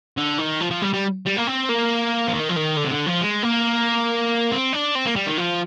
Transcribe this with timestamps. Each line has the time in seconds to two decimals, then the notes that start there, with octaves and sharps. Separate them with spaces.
0.17 D3
0.38 D#3
0.61 F3
0.71 F3
0.82 G3
0.94 G3
1.26 G3
1.37 A#3
1.47 C4
1.69 A#3
2.28 F3
2.34 D#3
2.50 F3
2.57 D#3
2.77 D3
2.85 C3
2.91 D3
3.07 F3
3.21 G#3
3.43 A#3
4.52 C4
4.73 D4
4.95 C4
5.06 A#3
5.16 G3
5.27 D#3
5.38 F3